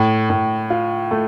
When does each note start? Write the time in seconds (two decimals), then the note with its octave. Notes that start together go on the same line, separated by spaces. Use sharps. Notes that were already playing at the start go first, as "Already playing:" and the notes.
Already playing: A2
0.30 A2
0.70 F4
1.11 A3